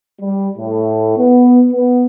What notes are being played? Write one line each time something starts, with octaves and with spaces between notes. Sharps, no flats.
G3
A2
B3
B3